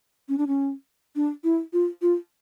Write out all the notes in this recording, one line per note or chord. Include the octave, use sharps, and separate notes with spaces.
C#4
D4
C#4
D4
E4
F4
F4